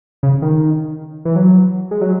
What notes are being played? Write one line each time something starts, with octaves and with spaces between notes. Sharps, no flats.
C#3
D#3
E3
F#3
G#3
F#3